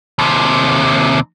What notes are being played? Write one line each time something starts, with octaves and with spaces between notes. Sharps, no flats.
D#2 C3